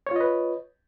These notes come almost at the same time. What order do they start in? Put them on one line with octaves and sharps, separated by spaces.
C#5 F4 D#5 B4